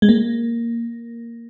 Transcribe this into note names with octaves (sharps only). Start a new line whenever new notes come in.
G#3
A#3